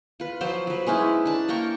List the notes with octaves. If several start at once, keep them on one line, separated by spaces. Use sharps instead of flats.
F4 B4
F3 F#3 C5
F#3 B4
G#3 C#4 D#4 E4
D4 A5
A#3 A#4 G5 C#6